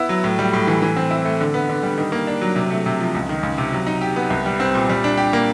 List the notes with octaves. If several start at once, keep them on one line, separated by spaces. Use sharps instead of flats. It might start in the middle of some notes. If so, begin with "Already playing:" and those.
Already playing: B3 E4
F#3
A2
G3
A2
E3
E3
C4
E4
A3
D3
B3
D3
G3
D#3
A#3
D4
F#3
C3
A3
C3
F3
C#2
D#3
C#2
C3
F#3
D#4
G4
B3
C2
G3
C4
A#2
G3
D4
G4
A#3